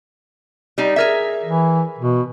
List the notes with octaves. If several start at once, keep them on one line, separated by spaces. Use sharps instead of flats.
G3 D#4
G#4 A#4 E5
E3
B2